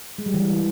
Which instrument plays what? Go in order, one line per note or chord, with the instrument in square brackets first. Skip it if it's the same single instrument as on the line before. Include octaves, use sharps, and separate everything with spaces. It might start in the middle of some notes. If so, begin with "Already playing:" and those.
[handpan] G#3
G3
E3